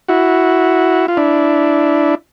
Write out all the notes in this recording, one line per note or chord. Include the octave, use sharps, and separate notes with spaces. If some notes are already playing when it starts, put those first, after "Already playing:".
E4 F#4
F4
D4 E4